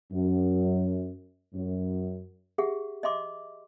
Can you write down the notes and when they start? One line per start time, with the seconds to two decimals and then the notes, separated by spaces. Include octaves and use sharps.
0.12 F#2
1.53 F#2
2.58 G4 G#4 E5 F#5
3.03 D#5 E5 C6 D6